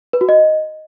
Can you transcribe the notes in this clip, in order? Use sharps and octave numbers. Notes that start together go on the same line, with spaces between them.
B4
F#4
D#5